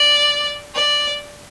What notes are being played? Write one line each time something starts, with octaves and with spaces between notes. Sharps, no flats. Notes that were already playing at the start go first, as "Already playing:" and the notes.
Already playing: D5
D5